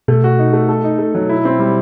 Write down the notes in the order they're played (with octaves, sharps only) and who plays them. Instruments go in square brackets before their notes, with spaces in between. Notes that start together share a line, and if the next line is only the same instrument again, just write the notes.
[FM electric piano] B2 [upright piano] A3
[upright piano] F#4
D#4
A3
A4
D#4
A3
F#3
E4
C4
G3